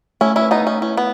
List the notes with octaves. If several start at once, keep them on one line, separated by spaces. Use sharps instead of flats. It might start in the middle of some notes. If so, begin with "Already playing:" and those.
A3 C#4 E4
C#4 E4
B4
B3 D#4
A3
C#4
C#4 E4
B3